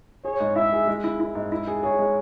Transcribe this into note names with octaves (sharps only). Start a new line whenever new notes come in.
G#4 C#5
G#2
E4 E5
G#4
G#3
E4
E4
G#2
E4
G#4
G#4 C#5
G#3